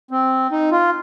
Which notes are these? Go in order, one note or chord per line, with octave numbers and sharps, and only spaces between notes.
C4
D#4
F4